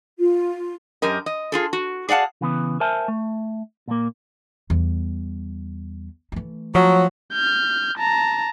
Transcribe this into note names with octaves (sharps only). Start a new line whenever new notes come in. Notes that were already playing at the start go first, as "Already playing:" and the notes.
F4
F#2 G4 A#4 D#5
D#5
F4 G#4 A4
F#4
G#4 D5 F5 F#5 A5
C#3 E3 B3
A#4 C5 E5 G#5 A5
A3
A#2 A#3
E2 G3
E3 A3
F3 F#3
F6 G6
A5 A#5